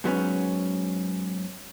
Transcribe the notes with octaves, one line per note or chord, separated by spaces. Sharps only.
G#2 F#3 B3 C#4